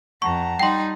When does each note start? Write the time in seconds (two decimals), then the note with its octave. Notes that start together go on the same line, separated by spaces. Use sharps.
0.22 F2 F#5 A5 A#5 C#6
0.59 G3 D#4 G5 C6